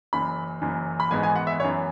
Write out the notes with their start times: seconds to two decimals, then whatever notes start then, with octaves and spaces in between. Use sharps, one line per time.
0.13 F#1 F#2 E3 B5
0.62 F#1 F#2 E3
1.00 B5
1.11 G#1 G#2 E3 G#3 B3 G#5
1.23 G#5
1.36 F#5
1.47 E5
1.59 F#2 E3 B3 C#5